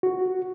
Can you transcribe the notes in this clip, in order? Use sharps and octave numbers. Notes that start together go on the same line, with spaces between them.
F#4